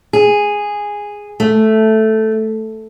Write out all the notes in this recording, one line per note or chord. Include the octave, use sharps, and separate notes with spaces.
G#4
A3